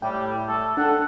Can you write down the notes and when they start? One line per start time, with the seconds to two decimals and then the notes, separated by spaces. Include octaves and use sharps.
0.02 A2 G3 G5
0.49 A3 A4
0.77 D4 A4 F#5